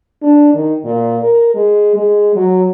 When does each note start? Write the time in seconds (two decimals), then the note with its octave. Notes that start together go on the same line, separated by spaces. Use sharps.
0.22 D4
0.54 D#3
0.85 A#2
1.22 A#4
1.55 G#3
1.96 G#3
2.36 F#3